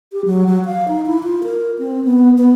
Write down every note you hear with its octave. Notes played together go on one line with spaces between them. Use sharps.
G4
F#3
F#3
F5
D#4
E4
F4
A#4
C4
B3
B3